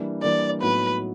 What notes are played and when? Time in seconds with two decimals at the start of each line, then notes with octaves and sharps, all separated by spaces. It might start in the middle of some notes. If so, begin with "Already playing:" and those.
Already playing: E3 G3 A#3 D4
0.23 E3 G3 A#3 D4 D5
0.61 A2 F#3 B3 D#4 B4